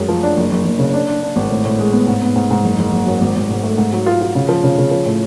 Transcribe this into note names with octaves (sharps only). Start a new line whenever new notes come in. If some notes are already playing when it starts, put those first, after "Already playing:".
Already playing: F#2 G#3
F3
D4
F#1
F#1
F#1
C#3
D4
D4
D4
G#1
A2
A2
G#3
B3
G#2
B3
G#2
G#2
F#1
F#1
F#1
F#2
G#1
G#1
G#2
A3
G#2
F#3
F4
F4
C#3
F3
C#3
C#3
F3
A2